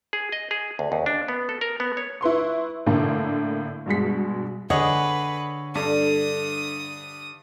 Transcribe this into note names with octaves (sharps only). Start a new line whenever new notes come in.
G#4
D#5
G#4
D2
D#2
D4
B3
A4
A#4
B3
C#5
E4 B4 C6 C#6
A2 D3 A#3 A5
G2 B2 G#3 B6
D3 G#4 B4 C#5 D#5 F#5
G2 D4 A4 D#6